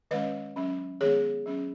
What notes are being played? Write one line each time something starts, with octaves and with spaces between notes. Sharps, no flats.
D#3 G#3 C#4 B4 D#5
F#3 C#4
D#3 G#3 B3 G#4 C#5
F#3 C#4